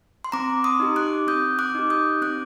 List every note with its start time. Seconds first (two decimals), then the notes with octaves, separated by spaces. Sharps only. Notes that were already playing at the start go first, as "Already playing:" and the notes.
0.24 C6
0.32 C4 A#5 D6
0.64 C6 D#6
0.80 D#4 G4
0.96 D6 F#6
1.27 C4 D#6 G6
1.59 D6 F#6
1.75 D#4 G4
1.90 D#6 G6
2.22 C4 D6 F#6